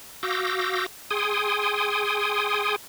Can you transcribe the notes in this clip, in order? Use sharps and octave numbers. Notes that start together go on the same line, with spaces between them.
F#4 F5 D6 E6 G6 A#6
G#4 G5 G#5 C6 D#6